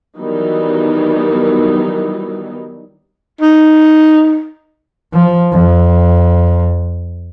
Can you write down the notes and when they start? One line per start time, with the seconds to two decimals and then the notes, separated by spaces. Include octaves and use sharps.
0.18 D#3 E3 F#3 G3 B3 D#4
3.41 D#4
5.14 F3
5.52 F2